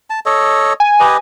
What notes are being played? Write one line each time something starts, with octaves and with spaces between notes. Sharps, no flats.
A5
A4 C#5 D#5
G#5
G4 B4 D#5